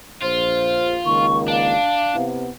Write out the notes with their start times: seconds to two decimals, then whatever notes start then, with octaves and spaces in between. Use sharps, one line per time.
0.23 A#1 F4 C5
1.05 C#2 D#3 A#3 C#6
1.48 D4 F5
2.14 C3 B3 E4